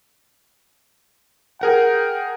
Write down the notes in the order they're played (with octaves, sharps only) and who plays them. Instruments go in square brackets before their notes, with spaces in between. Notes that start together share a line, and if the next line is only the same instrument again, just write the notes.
[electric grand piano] G#4 A#4 F#5 [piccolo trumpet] G5